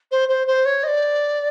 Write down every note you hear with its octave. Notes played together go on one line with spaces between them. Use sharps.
C5
C5
C5
C#5
D#5
D5